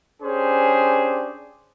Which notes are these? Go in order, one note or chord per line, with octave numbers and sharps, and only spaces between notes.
C#4 D4 G4 G#4 C5